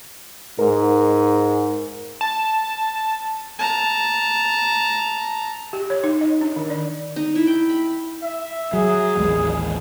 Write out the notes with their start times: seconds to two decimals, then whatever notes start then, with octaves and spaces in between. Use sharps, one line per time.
0.59 G#2 A#4
2.21 A5
3.59 A5 A#5
5.73 G4
5.90 C#5
6.04 D#4
6.21 D#5
6.41 D4
6.56 D#3
6.70 D5
7.16 D#4
7.35 E4
7.47 G5
7.69 B5
8.23 E5
8.73 F#3 G#4
9.17 A1 D#2 G#3